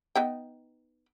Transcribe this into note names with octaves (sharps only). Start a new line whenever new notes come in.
B3 D#4 G5